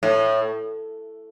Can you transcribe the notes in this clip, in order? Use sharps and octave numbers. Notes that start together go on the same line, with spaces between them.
A2